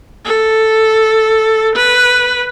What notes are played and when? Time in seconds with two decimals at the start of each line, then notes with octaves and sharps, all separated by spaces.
0.25 A4
1.75 B4